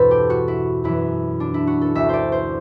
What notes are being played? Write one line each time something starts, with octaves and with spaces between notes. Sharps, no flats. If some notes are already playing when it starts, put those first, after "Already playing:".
Already playing: E2 G2 B2 E3 A4 B4 C5
G4
F#4
E4
F#2 E3 E4
D4
E4
F#4
A4
D2 D3 E5
C5 D5
C5